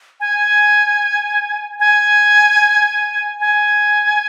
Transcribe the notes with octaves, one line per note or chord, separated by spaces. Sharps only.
G#5
G#5
G#5